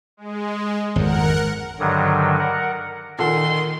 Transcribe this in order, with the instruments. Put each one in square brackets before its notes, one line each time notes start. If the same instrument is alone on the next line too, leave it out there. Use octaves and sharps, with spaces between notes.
[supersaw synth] G#3
[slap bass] G#1 F2 [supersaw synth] A#4 F#5
[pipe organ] G2 D3 D#3 F#3
A#4 F#5
[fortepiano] A#2 [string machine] D#3 [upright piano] A4 F#5 [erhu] C6